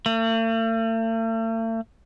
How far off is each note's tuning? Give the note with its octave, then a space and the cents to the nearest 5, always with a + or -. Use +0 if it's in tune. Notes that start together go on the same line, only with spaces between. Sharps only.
A3 +45